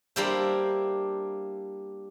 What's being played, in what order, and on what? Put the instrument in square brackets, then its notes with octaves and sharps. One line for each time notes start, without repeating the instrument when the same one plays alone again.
[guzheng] G3 A#3 D4 E4 G4 C5